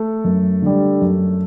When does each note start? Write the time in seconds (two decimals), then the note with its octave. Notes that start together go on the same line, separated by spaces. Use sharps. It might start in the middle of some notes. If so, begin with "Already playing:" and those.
Already playing: A3 A4
0.24 F#2
0.62 D3 G3
1.01 F#2